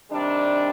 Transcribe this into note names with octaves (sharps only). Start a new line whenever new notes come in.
C3 D#3 G3 D4